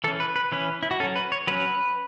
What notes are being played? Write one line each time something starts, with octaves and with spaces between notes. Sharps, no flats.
E3 C#4 A4
B4
B4
E3 C#4 B4
E4
F#4
F#3 C#4 A4
B4
C#5
F#3 C#4 B4